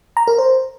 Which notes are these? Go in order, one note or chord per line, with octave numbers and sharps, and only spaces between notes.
A#5
A#4
C5